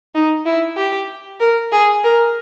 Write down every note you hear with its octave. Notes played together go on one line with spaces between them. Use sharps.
D#4
E4
G4
A#4
G#4
A#4